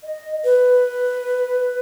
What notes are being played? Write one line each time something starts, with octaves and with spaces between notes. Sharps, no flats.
D#5
B4